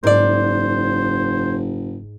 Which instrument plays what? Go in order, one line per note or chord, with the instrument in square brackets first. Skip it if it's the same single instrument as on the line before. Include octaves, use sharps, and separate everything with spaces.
[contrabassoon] F#1 [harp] G#2 [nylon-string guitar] A#4 D5 [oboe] C5